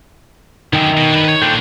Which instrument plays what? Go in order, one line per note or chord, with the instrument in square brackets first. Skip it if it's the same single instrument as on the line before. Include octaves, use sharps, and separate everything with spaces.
[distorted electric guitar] F#2 D3 [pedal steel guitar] D#3 D#4 G5
[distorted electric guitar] B2
D4 B4
B4 C#5
[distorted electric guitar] A#2 D4 [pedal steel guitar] A4 C5 G5